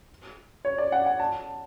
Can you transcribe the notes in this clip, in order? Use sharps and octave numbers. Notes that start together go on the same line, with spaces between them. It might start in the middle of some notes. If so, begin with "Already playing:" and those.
C#5
D5
F#5
F#5
A5